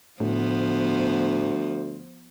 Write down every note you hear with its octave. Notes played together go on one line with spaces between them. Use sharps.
D2 A2 F3 B3 C5